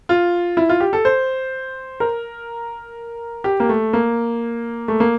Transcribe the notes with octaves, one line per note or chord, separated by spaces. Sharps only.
F4
E4
F4
G4
A4
C5
A#4
G4
A#3
A3
A#3
A3
A#3